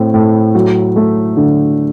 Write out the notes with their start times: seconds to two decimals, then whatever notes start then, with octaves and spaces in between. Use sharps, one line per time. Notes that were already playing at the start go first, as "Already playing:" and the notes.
Already playing: A2 C4
0.14 A2
0.55 F#3
0.96 A3
1.37 D3